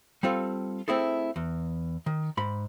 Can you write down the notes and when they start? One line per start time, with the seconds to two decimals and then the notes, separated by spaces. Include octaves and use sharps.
0.23 G3 C4 F4 A4
0.88 A3 C4 E4 G#4 A4
1.36 E2
2.06 D#3
2.37 G#2 B5